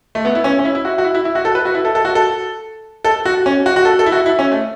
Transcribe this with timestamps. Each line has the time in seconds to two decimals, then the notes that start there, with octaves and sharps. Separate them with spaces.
0.15 A3
0.25 B3
0.35 E4
0.44 C#4
0.59 C#4
0.65 E4
0.75 E4
0.85 F#4
0.98 F#4
1.04 E4
1.15 E4
1.25 E4
1.35 F#4
1.45 A4
1.55 B4
1.65 F#4
1.75 E4
1.85 A4
1.95 A4
2.05 F#4
2.15 A4
3.05 A4
3.25 F#4
3.46 C#4
3.66 F#4
3.76 F#4
3.85 A4
3.99 A4
4.06 E4
4.12 F#4
4.26 E4
4.39 C#4
4.52 A3